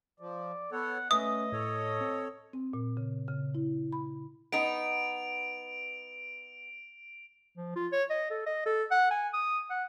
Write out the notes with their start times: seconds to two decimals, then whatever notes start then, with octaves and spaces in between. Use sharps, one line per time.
0.20 F3 D5
0.72 B3 A4 C#5 F#5
1.11 A3 C#4 B4 D#5 E5 D#6
1.52 A2 A4 C#5
2.01 C4
2.53 C4
2.73 A#2
2.97 C#3
3.28 C#3
3.55 E4
3.93 B5
4.52 B3 D#4 D7 F7
7.57 F3
7.76 F4
7.92 C#5
8.10 D#5
8.31 A4
8.47 D#5
8.66 A4
8.91 F#5
9.11 G#5
9.33 D#6
9.70 F#5